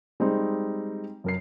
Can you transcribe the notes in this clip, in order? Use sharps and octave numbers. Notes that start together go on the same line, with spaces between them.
G3 G#3 C4 D#4 G#4
F#2 A#4 C7